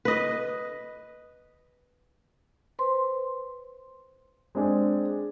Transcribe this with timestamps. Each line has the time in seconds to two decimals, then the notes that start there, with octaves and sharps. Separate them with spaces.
0.05 B4 D#5
2.79 B4 C5 C6
4.55 G#3 C4 D4 G#4